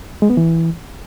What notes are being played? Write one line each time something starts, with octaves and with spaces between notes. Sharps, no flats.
G#3
B3
E3